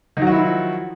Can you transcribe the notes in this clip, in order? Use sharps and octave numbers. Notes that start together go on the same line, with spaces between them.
D#3 F3 F#3 E4 F#4